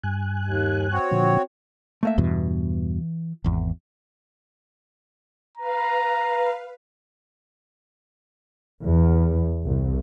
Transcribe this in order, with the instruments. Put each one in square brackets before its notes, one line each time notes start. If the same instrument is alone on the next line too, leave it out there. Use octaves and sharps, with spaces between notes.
[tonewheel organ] G2 G#5 F#6
[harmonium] D#2
C4 F#4 C#5
[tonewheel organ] A#2 D3 F3
[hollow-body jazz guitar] A3 A#3 E5
[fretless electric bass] E2 G2 B2 [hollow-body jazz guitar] E3
[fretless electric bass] G#1 E2
[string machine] B4 F5 [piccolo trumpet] A#5
[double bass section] E2
C2